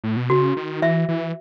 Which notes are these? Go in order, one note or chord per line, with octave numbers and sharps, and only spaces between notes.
A2
B2
C#3 F#4
D#3
E3 E5
E3